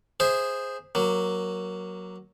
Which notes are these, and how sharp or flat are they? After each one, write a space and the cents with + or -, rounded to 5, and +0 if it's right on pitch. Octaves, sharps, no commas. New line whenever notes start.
G#4 -10 C5 +0 E5 +0
F#3 +0 A#3 +10